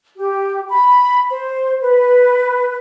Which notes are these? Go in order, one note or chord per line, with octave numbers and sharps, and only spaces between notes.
G4
B5
C5
B4